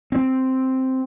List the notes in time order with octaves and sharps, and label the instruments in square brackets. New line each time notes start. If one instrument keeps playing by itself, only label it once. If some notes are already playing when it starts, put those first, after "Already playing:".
[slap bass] C4